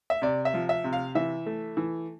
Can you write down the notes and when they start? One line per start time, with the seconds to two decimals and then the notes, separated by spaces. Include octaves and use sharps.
0.10 E5
0.22 C3 D5
0.45 E5
0.54 F3
0.69 E5
0.84 C3
0.93 F5
1.15 E3 E5
1.46 A3
1.77 E3